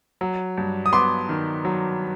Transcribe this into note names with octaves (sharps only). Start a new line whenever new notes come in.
F#3
G2
D#6
B3 C6 D6
D#3
F#3